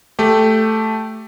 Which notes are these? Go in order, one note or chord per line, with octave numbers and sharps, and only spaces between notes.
A3 G4